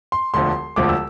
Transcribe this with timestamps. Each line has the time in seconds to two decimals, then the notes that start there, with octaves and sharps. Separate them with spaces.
0.12 C6
0.34 E1 D2 D3 F3 C6
0.76 E1 D2 D3 F3 D6
0.89 E6